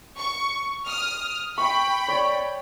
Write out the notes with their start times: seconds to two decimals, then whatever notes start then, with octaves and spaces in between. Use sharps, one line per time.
0.17 C#6
0.85 D#6 F6
1.58 G5 B5 C#6
2.08 C#5 D5